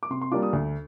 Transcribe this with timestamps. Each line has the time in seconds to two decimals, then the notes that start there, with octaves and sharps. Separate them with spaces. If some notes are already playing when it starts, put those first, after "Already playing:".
0.03 D6
0.10 C3 C6
0.21 C6
0.31 G3 A#3 D4 F4 D6
0.43 D#6
0.53 D2